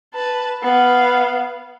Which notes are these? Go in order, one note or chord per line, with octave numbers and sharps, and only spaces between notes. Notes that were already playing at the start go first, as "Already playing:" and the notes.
B4 A5
B3 F5